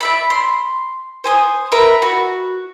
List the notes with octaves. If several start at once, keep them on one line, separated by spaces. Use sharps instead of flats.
D5 E5 B5
C6
C5 G#5 D#6
A#4 B4 E5
F#4